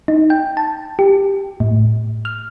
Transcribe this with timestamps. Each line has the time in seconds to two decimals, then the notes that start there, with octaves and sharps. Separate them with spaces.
0.08 D#4
0.30 G5
0.57 A5
0.99 G4
1.60 A2
2.25 F6